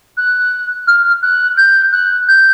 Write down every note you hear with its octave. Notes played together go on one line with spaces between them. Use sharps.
F#6
F6
F#6
G6
F#6
G6